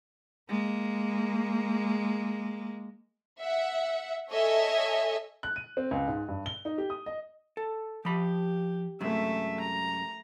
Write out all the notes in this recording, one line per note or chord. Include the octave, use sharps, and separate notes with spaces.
G#3 A#3
E5 F#5
A4 C#5 D#5 E5 G#5
F#6
D#7
C4
C#2
G#2
G2
G7
D#4
G4
D#6
D#5
A4
F3 G4 B5
F#2 C3 G#3 A3 E5
A#5